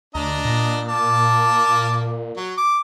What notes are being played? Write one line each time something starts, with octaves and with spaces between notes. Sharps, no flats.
D2 D4 D#5 A#5
A#2
A#3 A5 D6
F#3
D6